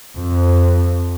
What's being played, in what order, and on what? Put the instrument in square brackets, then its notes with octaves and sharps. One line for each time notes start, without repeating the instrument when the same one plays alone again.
[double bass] F2